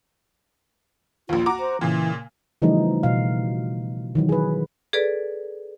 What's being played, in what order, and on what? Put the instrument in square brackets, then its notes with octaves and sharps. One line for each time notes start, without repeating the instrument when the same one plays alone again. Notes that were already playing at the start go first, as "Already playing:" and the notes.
[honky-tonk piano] A#1 D#2 [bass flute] F4
[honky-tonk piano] F#4 A#5 D6
[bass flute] C5
[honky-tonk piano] A#2 C#3 [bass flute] E3
[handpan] C#3 E3 F3 G3 A3 D#4
B2 F5
D#3 E3 F#3
G#4 B4
[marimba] G#4 A4 B4 D5